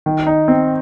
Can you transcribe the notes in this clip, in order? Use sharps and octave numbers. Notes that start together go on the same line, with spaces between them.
D#3
D#4
C4